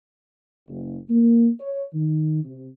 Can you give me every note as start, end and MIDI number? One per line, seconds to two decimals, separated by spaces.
0.69 0.97 30
1.10 1.49 58
1.60 1.83 73
1.93 2.41 51
2.45 2.67 48